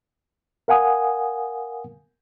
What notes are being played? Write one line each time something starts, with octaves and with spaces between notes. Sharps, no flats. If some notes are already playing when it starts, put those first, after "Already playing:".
A#4 F5 F#5 G#5 D#6